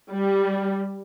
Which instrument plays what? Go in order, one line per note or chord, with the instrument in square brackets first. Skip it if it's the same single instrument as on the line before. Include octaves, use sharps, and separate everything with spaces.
[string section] G3